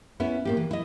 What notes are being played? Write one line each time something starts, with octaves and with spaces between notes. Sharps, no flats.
B3 C#4 E4
A2 A#3 G4
E3
E4 D#5